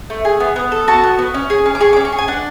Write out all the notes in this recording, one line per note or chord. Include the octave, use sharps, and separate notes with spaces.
A3
G#4
B3
B3
A4
F#4 A5
B3
B3
C#4
G#4
C#4
D6
G#4 C#6
D6
C#4
C#6
G#4
G#5
D4 F#5